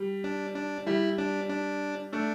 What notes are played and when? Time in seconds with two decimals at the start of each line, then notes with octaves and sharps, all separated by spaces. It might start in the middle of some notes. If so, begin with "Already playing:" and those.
Already playing: G3
0.24 D4
0.55 D4
0.86 G3 E4
1.18 D4
1.50 D4
2.13 A3 D4